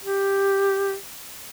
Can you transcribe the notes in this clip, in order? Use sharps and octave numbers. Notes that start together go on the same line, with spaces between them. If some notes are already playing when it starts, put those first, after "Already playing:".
G4